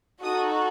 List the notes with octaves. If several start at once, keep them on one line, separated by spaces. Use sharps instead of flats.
D#4 F#4 A4 D#6